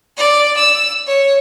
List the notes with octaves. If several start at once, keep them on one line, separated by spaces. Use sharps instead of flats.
D5
E6
C#5